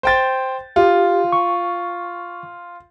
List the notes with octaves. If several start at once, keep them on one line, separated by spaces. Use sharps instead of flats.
C5 G5 A6
F4 G4
C#6